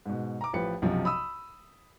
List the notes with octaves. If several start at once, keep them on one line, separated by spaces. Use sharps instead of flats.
G#2 B2
A#5 D6
A1 F3 G4 B4 C#7
B1 F#2 C3 F3
B5 D#6 E6